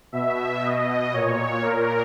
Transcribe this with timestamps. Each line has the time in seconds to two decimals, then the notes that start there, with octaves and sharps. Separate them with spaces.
0.12 B2 E5
0.62 B2 D#5
1.13 A#2 C#5
1.63 A#2 A#4